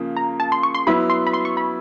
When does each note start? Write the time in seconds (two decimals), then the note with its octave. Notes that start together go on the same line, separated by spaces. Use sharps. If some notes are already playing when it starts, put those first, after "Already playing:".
Already playing: C#3 F3 A#3
0.17 A#5
0.40 A5
0.52 C6
0.63 C#6
0.75 C6
0.87 F#3 B3 E4 B5
1.10 C6
1.27 B5
1.33 C6
1.45 C#6
1.57 B5